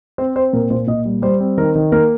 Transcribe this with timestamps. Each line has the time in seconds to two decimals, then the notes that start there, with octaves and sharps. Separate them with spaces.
0.18 C4 C5
0.36 C4 C5
0.53 A#2 A#4
0.70 A#2 C5
0.87 A#2 D#5
1.05 G3
1.22 G3 C5
1.40 C4
1.58 D#3 A#4
1.76 D#3
1.92 A#3 A#4